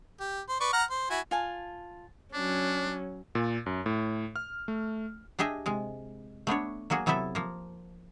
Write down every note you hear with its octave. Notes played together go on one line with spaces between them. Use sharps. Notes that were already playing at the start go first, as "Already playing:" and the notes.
G4
C5
B4 D5 C#6
F#5 A#5 F6
C5
E4 F#4 G#5
F4 G#5 A5
F#3 C#4 D4
A#2
F#2
A2
F6
A3
D4 G4 G#4 D#5 E5
C3 G#3
A3 B3 D4 C#5
F#3 A#3 F#4 G#4
C3 F#3 B3 E4 A4 E5
F3 A#3